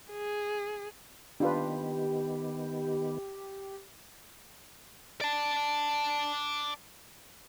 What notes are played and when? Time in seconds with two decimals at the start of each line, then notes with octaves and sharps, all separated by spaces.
0.12 G#4
1.40 D#3 B3 D4 F4 G4 B4
5.21 D5 A5